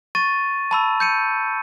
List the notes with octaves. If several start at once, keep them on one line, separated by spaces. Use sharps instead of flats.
C#6 A6 D#7
A5 B5 E6
G6 C#7 D#7